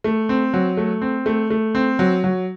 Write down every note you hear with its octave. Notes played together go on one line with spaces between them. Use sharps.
A3
C4
F#3
A3
C4
A3
A3
C4
F#3
F#3